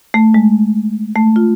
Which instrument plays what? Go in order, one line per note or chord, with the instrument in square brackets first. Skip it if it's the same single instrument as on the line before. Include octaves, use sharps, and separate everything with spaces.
[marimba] A3
G#3
A3
F4